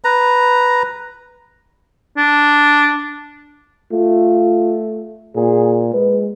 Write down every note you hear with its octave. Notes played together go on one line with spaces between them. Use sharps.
B4 A#5
D4
A3 F4
A#2 G#4
G#3 B4